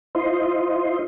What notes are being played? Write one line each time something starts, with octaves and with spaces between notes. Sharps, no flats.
E4 F4 C5 D#5 C6